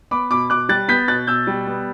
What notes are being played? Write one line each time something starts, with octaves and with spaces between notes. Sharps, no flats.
B3 B5 D6
B2 B5 D6
B2 D6 F#6
G3 F#6 A6
B3 G6 B6
B2 F#6 A6
B2 E6 G6
G3
B3